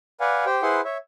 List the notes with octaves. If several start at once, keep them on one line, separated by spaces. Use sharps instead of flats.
B4 D5 F5 F#5 G#5
G4 C5 G5
E4 G#4 B4 C5 F#5 C6
C#5 E5